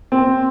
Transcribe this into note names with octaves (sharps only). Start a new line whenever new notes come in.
C4